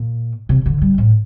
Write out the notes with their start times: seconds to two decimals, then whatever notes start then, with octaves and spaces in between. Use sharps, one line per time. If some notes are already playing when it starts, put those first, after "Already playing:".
Already playing: A#2
0.49 C3
0.66 D3
0.82 G3
0.98 A2